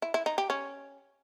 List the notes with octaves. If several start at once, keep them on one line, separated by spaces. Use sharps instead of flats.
E4
E4
D#4
G4
C#4